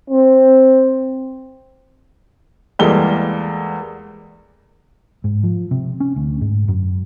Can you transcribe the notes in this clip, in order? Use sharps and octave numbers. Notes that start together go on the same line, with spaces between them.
C4
E2 G3 G#3 A#3 A4 G7
G#2
F3
C3
C#4
D2
G#2
F#2